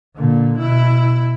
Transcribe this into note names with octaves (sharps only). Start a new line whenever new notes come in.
A#2 D3
B2 E4